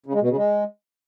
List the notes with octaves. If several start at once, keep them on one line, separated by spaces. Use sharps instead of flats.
C#3
G#3
B2
C#3
G#3